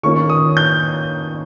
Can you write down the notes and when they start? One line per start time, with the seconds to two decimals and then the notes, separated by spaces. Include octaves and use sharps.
0.03 D#3 A#3 C#4 F4 C#6
0.30 D#6
0.57 G6